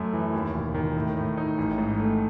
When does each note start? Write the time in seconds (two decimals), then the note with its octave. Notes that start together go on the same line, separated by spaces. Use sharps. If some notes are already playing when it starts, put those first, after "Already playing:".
Already playing: F#2 A3
0.13 E3
0.33 D#2
0.54 E1
0.74 D#3
0.96 A2
1.17 A2
1.37 D#4
1.58 A1
1.78 G#2
1.99 A3